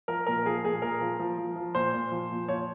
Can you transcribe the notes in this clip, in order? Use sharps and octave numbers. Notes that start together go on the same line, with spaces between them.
F3 A#4
A#2 A#4
F3 G#4
A#2 G#4
A#2 A#4
F3
F3
F3
F3
A#2 C5
A#2
F3
A#2
F3 C#5